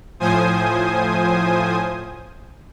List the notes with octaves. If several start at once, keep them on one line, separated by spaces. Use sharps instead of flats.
A2 F3 C5 G#5 D#6